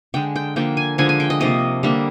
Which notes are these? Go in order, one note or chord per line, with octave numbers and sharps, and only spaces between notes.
D3 G#3 G5
G5
D3 F3 A#3 G5
G#5
D3 F3 G#3 G#5
G#5
G5
D#5
C3 F3 A#3 D#5
D3 G3 A#3